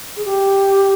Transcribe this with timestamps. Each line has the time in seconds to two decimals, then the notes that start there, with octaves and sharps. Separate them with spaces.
0.16 G#4
0.25 G4